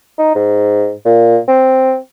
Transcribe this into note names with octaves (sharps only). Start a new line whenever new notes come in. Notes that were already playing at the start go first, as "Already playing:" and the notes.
D#4
G#2
A#2
C4